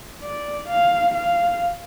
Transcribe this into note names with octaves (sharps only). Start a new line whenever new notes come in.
D5
F5
F5